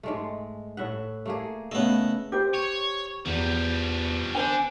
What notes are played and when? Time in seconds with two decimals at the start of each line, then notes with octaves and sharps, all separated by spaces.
0.03 G#2 G#3 A3
0.77 A2 E5 F#5
1.26 A3 A#3 G#4
1.72 C#3 A3 B3 D#5
2.32 G4 C5
2.54 C#5
3.26 E2 F3 G3
4.35 D3 D4 C5 G#5